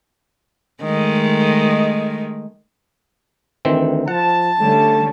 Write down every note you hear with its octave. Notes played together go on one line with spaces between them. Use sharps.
D#3 G#3 A3
D2 D#3 E3 C4
F3 F#5 A5
D3 G3 A3 C#4